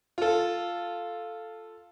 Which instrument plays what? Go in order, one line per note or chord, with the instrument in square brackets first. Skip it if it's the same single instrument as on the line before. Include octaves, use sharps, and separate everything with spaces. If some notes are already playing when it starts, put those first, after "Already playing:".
[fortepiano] F4 A4